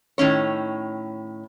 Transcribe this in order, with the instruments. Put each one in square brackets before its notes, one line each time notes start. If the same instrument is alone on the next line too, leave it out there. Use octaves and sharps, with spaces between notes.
[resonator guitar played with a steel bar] A2 D#3 C#4 C#5